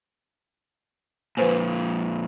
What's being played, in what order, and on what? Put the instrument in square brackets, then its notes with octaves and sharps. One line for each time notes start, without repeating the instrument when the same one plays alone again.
[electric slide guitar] F2 A#2 [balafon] B4 C5 G#5